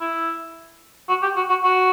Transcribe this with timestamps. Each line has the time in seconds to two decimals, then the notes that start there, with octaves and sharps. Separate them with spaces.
0.01 E4
1.09 F#4
1.22 G4
1.36 F#4
1.49 F#4
1.63 F#4